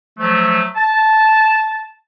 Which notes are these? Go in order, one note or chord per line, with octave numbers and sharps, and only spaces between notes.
F3 F#3 A3
A5